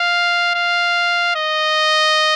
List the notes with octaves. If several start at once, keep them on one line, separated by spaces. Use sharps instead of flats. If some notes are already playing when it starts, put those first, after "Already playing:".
Already playing: F5
F5
D#5